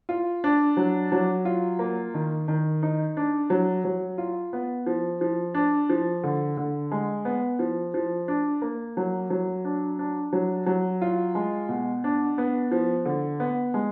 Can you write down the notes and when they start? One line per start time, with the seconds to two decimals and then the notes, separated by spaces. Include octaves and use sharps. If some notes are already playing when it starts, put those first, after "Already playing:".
0.09 F4
0.44 D4
0.77 F#3
1.12 F#3
1.45 F4
1.79 A#3
2.14 D#3
2.48 D#3
2.83 D#4
3.17 D4
3.50 F#3
3.84 F#3
4.18 F4
4.53 B3
4.86 F3
5.21 F3
5.54 D4
5.90 F3
6.24 D3
6.57 D3
6.91 G#3
7.25 B3
7.59 F3
7.94 F3
8.28 D4
8.62 A#3
8.97 F#3
9.30 F#3
9.65 D4
9.99 D4
10.33 F#3
10.66 F#3
11.02 F4
11.35 G#3
11.69 B2
12.04 D4
12.38 B3
12.71 F3
13.05 D3
13.40 B3
13.74 G#3